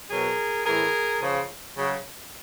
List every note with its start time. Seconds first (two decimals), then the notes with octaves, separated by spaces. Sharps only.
0.11 B2 F#3 G#4 A#4
0.66 A2 E3 G#4 A#4
1.21 C#3 F3
1.76 C#3 F#3